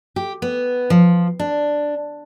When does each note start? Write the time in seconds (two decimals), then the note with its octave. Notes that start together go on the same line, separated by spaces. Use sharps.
0.16 G4
0.42 B3
0.90 F3
1.39 D4